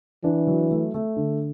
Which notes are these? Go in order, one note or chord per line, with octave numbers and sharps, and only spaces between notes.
E3 D4
F#3
A3
A3
D3